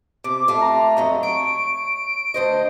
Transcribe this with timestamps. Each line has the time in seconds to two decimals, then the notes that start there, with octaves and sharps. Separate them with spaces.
0.24 C3 D6
0.48 A3 F4
0.62 A#5
0.97 F2 F#3 D#5
1.23 C#5 D7
2.34 D2 C5 D#5